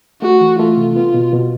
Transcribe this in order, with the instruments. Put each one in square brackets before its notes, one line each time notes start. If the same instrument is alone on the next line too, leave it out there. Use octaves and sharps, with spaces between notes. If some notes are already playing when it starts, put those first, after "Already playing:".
[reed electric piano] A3 [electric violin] F#4
[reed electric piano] E3
[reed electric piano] A3 [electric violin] F4
[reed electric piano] C3
[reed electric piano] B3 [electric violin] F4
[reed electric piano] B2
B2